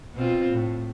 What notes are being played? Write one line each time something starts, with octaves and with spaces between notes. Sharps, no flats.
B2 C4 F4
A2